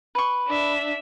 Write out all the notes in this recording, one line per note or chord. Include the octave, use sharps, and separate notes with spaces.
B4 C#6
D4 E5